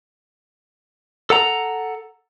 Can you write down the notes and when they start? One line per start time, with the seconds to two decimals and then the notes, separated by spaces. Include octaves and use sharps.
1.30 A4 F#5 A#5